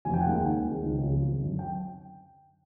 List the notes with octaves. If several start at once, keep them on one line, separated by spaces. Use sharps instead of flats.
F1 G#5
G5
F#5
D#2 D#3 G#3 G5
D#2
D#3 G#3 C4 D#4
C#2
C#3
F3
G#1
F#2 D3
G5